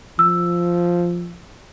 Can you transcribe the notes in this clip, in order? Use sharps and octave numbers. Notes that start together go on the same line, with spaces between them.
F3 E6